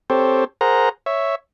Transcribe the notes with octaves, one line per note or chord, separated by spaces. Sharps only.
C4 G4 A4 C5 C#5
G#4 A#4 C5 F#5 A#5
C#5 E5